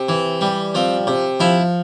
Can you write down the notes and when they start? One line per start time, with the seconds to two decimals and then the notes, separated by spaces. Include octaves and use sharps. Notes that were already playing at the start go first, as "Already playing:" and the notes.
Already playing: C3
0.09 E3
0.41 G3
0.75 F3 C4
1.07 C3
1.40 F3 E4